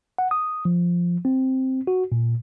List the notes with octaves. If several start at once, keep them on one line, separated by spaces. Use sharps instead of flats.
F#5
D#6
F3
C4
F#4
A#2